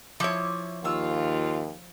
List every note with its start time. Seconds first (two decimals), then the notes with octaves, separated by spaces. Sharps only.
0.20 F3 E4 C#5 D6
0.84 D#2 F4 C#6 E6